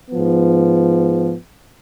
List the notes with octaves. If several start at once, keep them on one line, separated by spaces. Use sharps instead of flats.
G#2 F3 B3